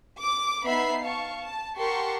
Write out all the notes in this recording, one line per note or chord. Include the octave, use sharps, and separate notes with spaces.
D6
B3 D#4 E5 B5 C7
F5 A5 C#6
A5
G4 A#4 F#5 A5 C6 C#6